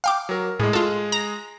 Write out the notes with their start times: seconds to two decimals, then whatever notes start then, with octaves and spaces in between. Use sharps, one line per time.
0.04 F5 G5 D6
0.29 F#3 A#4
0.60 A2 G#3 G#4
0.73 F4 A4
1.12 A#5